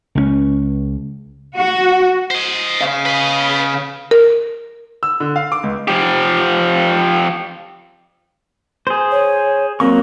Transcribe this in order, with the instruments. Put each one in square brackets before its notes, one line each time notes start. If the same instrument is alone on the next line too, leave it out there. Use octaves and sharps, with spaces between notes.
[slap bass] C#2 G3 C#4
[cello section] F#4
[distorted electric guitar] C5 D#5
[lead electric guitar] C#3 F5
[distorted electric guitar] B4 D#5
[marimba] A#4
[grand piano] E6
D3
F5
D6
C#2
[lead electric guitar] F3 G4
[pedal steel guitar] G#4 C5
[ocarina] C#5
[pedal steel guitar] F#3 A#3 C#6 [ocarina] C4